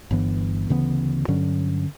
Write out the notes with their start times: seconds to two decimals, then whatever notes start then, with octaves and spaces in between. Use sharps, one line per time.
0.11 G1 G2 E3 B3
0.69 D2 C#3 E3 B3
1.28 G2 D3 F#3 C#4